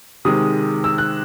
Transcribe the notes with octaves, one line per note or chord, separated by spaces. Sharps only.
C3 D#3 G#3 D#6
E6
F#6